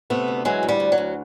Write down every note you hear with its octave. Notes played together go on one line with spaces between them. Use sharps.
C3 A3 B3
D2
E3 F#3 G#3
D2
G3
D2
F#3
D2